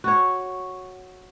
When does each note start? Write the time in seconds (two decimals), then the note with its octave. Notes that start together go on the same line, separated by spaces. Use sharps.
0.04 F#4 C#5